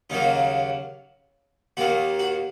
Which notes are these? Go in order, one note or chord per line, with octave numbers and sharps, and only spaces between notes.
D#2 C#3 F#3 A#3 D#4
D#2 D#3 A#3 F#4
F#4